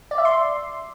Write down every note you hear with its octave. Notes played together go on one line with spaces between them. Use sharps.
D5
E5
C6